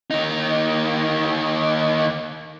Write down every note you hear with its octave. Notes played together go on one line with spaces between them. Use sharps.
D#2 D#4